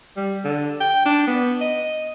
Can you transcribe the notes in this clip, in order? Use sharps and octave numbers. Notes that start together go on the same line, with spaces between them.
G3
D3
G5
D4
B3
D#5